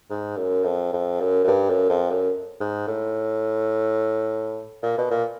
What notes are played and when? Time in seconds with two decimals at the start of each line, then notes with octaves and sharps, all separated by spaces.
0.10 G#2
0.37 F#2
0.64 F2
0.92 F2
1.20 F#2
1.44 F#2
1.48 G2
1.70 F#2
1.90 F2
2.11 F#2
2.60 G#2
2.88 A2
4.83 A#2
4.98 B2
5.11 A#2